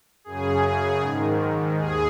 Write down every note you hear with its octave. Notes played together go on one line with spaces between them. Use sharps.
F#2 C#3 G#4
G#2 D#3
D#2 G#4